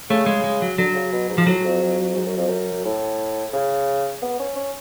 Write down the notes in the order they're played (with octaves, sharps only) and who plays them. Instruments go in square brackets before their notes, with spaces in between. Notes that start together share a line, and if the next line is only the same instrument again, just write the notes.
[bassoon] C#3 [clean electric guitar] A3
[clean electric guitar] G#3
G#3
F#3
[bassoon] D3 [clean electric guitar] F#3
[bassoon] C#3
B2
G#2
[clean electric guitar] F3
[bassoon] A2 [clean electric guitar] F#3
[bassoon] F2
F2
F2
G#2
F#2
F2
F#2
A2
C#3
B3
C#4
C#4